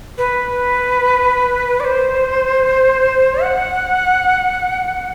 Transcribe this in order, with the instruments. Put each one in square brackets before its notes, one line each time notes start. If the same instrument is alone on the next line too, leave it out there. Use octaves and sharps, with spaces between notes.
[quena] B4
D5
C5
F#5